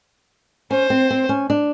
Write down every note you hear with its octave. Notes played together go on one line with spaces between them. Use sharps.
C#4 C5
C4
C4
C#4
D4